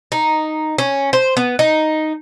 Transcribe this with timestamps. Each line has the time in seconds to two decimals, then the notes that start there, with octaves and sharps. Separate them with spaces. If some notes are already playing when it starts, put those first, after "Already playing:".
0.12 D#4
0.78 C#4
1.13 C5
1.37 B3
1.59 D#4